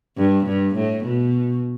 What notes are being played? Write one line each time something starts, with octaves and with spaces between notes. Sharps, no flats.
G2
G2
A2
B2